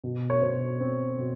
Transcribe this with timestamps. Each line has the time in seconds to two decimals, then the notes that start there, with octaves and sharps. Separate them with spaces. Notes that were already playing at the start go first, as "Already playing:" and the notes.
0.04 B2
0.30 C#5
0.42 B2 C5
0.80 C4
1.18 B2